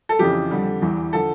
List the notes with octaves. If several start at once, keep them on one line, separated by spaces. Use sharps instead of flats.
A4
F2 C#3 E3 G4
F2 D3 G3
E2 E3 G3
D3 F3 A4